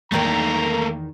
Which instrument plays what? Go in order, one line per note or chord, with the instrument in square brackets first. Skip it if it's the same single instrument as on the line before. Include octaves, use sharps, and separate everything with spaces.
[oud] E2 D#3 A#4 [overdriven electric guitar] A3 A#3 [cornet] A#5